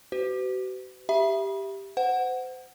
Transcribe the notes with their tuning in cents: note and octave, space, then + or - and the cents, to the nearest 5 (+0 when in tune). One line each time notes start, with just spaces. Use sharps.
F#4 +45 B4 +45
G4 +0 E5 +10 B5 -35
C5 -30 F#5 +0